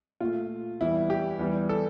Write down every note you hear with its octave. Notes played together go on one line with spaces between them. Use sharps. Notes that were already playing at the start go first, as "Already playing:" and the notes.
A#2 A3 F4
E2 E3 G3 E4
G4
E2 E3 G3
A4